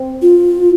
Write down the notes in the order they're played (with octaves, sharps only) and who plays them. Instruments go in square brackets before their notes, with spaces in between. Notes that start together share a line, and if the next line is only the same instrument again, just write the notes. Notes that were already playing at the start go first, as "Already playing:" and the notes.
Already playing: [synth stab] C4
[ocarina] F4